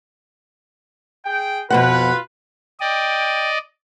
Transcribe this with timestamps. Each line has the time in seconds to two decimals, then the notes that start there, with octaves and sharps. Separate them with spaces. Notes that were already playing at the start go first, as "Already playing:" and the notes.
1.26 G#4 G5
1.70 F2 B2 F4 B4 F#5
2.80 D5 D#5 G5